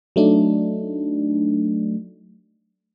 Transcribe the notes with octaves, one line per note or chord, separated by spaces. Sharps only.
F#3 A3 D4 D#4